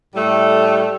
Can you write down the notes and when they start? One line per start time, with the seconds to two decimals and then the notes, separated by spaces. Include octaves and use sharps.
0.15 A2 G3 A3